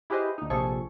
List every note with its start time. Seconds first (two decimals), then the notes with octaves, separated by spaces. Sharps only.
0.10 E4 G4 G#4 B4 C5 D#5
0.38 D2 D#4
0.50 A#1 C3 F3 G#4 A4 C#6